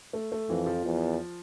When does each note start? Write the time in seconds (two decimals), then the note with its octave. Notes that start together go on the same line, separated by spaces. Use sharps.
0.13 A3
0.32 A3
0.49 F2 E3
0.66 F3
0.85 E2